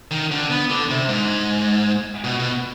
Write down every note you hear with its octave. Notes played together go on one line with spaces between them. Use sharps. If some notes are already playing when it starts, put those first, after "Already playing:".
D#3
D3
B3
D3
C3
G#2
B2
B2